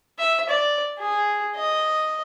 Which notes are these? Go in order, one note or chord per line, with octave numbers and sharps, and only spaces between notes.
E5
D5
G#4
D#5